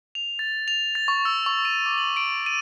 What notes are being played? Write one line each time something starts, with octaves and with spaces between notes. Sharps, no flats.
F7
A6
F7
A6
C#6
E6
C#6
D#7
D6
F#7
D7
D#7